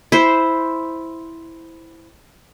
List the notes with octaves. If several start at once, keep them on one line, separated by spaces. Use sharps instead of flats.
E4 C5